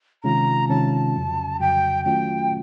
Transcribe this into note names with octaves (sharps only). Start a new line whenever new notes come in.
C3 D#3 G#3 C#4 F4 A#5
C3 D#3 G#3 C#4 F4 A5
F2 C#3 F#3
F2 C#3 F#3 G5
D#3 F#3 A3 C#4 F4 G5